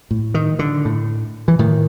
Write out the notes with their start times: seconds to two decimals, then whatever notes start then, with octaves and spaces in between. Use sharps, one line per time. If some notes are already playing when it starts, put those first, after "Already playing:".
0.11 A2
0.34 D#3
0.59 D3
0.85 A2
1.48 E3
1.59 A2 D#3